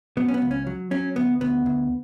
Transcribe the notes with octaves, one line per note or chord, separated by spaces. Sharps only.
F#3 B3
C#4
B3
C#2
C#4
F#3
F#3 C#4
D2 B3
D2 B3
D2